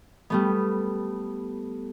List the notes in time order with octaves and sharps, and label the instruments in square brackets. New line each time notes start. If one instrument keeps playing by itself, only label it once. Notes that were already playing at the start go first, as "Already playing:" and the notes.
[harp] G3 A3 B3